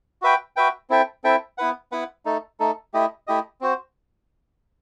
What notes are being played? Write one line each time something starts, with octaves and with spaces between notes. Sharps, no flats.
F#4 B4 E5 G5
F#4 B4 E5 G5
C4 E4 A4 E5 G5
C4 E4 A4 E5 G5
B3 E4 B4 F#5
B3 E4 B4 F#5
A3 D#4 A4
A3 D#4 A4
A3 E4 G4 D#5
A3 E4 G4 D#5
C4 F#4 C5